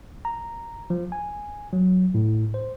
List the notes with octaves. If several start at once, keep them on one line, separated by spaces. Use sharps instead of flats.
A#5
F3
G#5
F#3
A2
C5